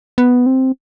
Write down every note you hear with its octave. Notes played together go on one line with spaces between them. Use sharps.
B3
C4